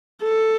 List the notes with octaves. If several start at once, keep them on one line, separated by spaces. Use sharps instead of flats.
A4